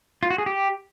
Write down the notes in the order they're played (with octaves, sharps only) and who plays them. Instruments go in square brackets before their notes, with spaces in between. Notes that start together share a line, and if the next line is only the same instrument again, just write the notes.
[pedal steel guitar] F4
F#4
G#4
G4